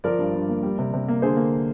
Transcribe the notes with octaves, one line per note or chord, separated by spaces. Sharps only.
F3 A#4 D5
G2
G2
A#3
G3
C3
C3
A#3
D3 G#4 C5
A#3